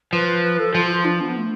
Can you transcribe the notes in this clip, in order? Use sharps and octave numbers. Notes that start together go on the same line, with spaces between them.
F3 B4
B4
B4
A4
F3 F4
F4
D4
B3
A3